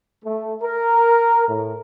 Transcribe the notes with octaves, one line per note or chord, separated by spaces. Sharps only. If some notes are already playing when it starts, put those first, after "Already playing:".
A3
A#4
A2